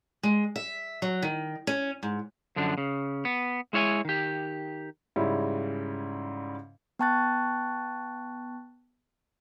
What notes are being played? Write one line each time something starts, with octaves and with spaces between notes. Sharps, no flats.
G#3
E5
F#3
D#3
C#4
G#2
F#2 D3 F3 D4
C#3
B3
G#3 E4 C#5 E5 G#5
D#3 G4
G#2 C#3 G3 C#4 E4
B3 G5 A5 C#6 F#6 A6